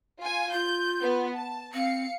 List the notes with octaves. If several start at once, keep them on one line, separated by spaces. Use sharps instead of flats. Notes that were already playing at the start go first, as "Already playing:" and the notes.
F4 G#5
F4 G6
B3
A5
C4 F5 C#7